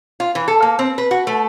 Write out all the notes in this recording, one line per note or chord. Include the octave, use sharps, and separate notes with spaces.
F4
E3
A4
A#3
C4
B4
F#4
A3